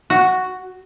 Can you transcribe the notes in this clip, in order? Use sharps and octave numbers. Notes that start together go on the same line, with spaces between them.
F#4